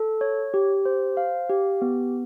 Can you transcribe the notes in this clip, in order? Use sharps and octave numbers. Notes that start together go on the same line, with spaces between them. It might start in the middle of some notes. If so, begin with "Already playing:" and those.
Already playing: A4
C#5
G4
C5
F5
G4
B3